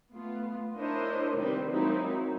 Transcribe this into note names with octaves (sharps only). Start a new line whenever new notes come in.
A3 B3 F4
D4 E4 A#4 C5 C#5 D#5
C3 D#3 G3 C4 B4 C5
F#3 G#3 A#3 C4 D#4 E4